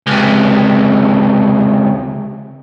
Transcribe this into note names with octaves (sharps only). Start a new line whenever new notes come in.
C#2 C3